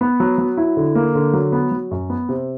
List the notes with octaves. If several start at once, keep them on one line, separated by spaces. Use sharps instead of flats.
B3
F#3
F#3
E4
D3
A#3
D3
F#3
B3
F#3
F#2
B3
C3